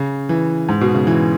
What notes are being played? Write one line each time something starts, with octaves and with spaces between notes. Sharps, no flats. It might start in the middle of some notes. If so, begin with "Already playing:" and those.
Already playing: C#3
E3
G#2
B2
C#3
E3